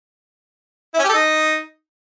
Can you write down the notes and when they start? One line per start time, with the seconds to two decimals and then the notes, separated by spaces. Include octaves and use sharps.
0.94 E4
0.99 C#4
1.04 G4
1.09 A4
1.14 D#4